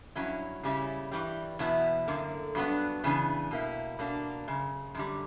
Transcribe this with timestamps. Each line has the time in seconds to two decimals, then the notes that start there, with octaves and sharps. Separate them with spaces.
0.15 G2 F#3 C#4 E4
0.63 C#3 G3 C#4 E4
1.11 G2 E3 G3
1.59 E2 B2 F#3 B3 E4
2.07 F#2 D3 A#3
2.55 G2 F#3 B3 D4
3.04 C#3 E3 B3 D4
3.51 B2 A#3 E4
3.99 B2 A#3 D4
4.48 F#2 C#3
4.95 F#2 D3 G3